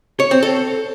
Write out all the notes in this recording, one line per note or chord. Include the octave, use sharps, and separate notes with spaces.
C#5
C4
A4